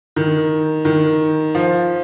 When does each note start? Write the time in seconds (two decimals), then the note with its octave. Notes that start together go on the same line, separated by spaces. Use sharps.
0.16 D#3
0.85 D#3
1.55 F3